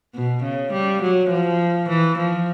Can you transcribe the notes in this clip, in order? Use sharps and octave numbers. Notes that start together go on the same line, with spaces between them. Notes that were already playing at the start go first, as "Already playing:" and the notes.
B2
C#3
G3
F#3
F3
E3
F3